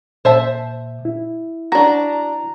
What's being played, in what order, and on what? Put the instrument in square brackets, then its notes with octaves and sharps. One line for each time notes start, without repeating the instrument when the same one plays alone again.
[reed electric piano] A#2 [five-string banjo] C5 E5 A5
[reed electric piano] E4
[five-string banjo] D4 F#4 [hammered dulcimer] A#5